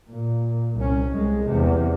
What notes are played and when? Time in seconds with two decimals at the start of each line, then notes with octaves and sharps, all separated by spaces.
0.10 A#2
0.76 C2 C#4
1.12 C2 G#3
1.48 E2 C3